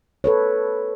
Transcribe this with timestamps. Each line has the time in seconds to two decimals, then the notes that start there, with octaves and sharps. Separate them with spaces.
0.24 A4 B4 C#5